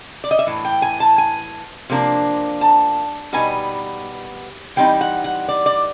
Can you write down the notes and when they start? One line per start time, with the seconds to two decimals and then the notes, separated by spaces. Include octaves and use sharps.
0.24 D5
0.31 D#5
0.39 E5
0.47 A2 E3
0.65 G5
0.82 G#5
1.00 A5
1.18 G#5
1.90 C3 F3 A#3 D4
2.61 A5
3.33 B2 G3 B3 D#4 G#5
4.76 E3 G3 C4 D#4 G5
5.01 F#5
5.24 F#5
5.49 D5
5.66 D5